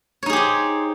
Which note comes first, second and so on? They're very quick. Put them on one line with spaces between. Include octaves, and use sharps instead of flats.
C#5 D#4 G#4 G4 C5